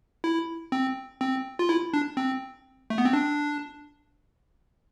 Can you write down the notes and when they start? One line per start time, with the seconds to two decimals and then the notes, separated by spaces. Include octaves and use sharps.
0.24 E4
0.72 C4
1.21 C4
1.59 F4
1.69 E4
1.94 D4
2.17 C4
2.90 A3
2.98 B3
3.05 C4
3.13 D4